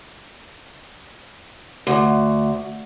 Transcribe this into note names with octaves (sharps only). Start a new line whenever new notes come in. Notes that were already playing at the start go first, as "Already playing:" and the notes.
D2